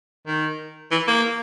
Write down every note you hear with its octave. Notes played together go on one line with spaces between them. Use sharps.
D#3
E3
A#3